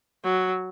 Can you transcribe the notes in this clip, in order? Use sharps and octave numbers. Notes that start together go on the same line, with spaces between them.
F#3